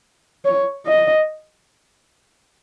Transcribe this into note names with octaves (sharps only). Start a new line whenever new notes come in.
C#5
D#5